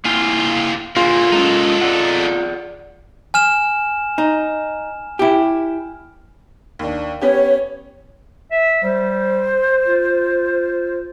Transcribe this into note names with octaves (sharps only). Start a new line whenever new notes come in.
A#3 E4 F4 G4 G#5
A#2 D3 A#3 F4 G#4
G#3 A#3 C#4 D#4 A4
G#4 D5 F#5
G#5 F6 E7
D#4
E4 G4
D#2 D4
B3 C#4 G4 C#5
E5
G3 C5
F4